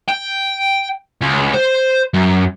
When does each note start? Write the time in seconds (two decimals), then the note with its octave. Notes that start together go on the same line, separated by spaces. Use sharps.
0.08 G5
1.21 C#2
1.54 C5
2.14 F#2